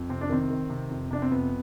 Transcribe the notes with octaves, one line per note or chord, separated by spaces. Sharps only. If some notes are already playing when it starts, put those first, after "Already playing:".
Already playing: F2
C3 C4
D4
D#3 C4
D#3
C3
F2
C3 D4
C4
F2 B3